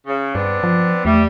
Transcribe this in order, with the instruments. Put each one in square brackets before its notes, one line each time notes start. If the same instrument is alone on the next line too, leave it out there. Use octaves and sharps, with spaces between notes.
[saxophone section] C#3
[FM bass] G2 [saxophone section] B3 C4 D4
[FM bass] F3
[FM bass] E2 [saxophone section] G3 [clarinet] A3